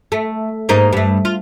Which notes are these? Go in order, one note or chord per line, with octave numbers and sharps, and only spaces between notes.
A3
G#2 A#3 D#4
G2 A3
F4